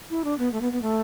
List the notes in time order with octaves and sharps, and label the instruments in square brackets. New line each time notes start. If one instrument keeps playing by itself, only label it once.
[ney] E4
D4
B3
A3
B3
B3
A3